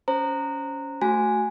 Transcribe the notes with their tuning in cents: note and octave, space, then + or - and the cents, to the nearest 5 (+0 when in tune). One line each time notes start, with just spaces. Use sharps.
C#4 +20 C5 +0 A#5 -15
A3 +0 F#4 +0 G#5 +0